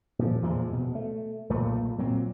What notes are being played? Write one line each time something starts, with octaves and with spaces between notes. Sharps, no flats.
A#2 F3
E2 A#2 F3 G#3
B2
A3
B1 A#2 A3 A#3
A#2 F#3 C4